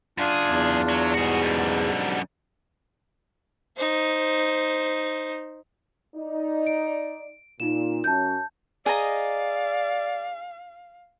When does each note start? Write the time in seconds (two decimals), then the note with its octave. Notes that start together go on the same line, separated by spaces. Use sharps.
0.18 F#2 D4 F4 G#4
0.45 E2
0.89 F#3
1.14 G#2 B2 G3 F#4 G#4
1.42 F#2 D3
3.77 D#4 C5
6.15 D#4 D5
6.67 D7
7.60 A#2 D#4 F4 E7
8.04 F#2 C#4 A5 G6
8.86 G#4 D5 D#5 F5 A#5